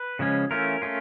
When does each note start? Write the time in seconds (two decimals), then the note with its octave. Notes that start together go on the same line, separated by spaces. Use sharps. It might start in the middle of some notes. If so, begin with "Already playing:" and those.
Already playing: B4
0.19 C#3 F3 G#3 C#4
0.51 E3 A3 C#4 F4 A#4
0.82 A3 C#4 F4